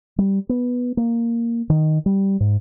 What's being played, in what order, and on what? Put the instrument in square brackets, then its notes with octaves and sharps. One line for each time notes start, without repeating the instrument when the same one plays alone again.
[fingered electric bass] G3
B3
A#3
D#3
G3
G#2